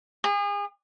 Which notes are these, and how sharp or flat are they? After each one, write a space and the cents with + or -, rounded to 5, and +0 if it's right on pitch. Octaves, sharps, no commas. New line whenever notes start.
G#4 -35